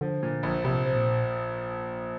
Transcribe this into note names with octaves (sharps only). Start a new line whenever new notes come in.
D3 F3
A#2
A#1
A#1 C3
F3
A#2